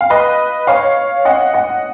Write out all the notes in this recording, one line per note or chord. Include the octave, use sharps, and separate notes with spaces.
F5
B4 D#5
C#5 F5
D#5 F#5
D#5 F#5